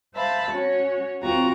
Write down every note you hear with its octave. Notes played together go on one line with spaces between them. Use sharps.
C5 E5 F5 A5 B5
C#4 F#4 C#5
D#2 C4 F4 F#4 A#5 C#6